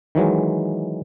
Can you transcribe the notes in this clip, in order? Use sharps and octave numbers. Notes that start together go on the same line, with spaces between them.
D#3 E3 F#3 G#3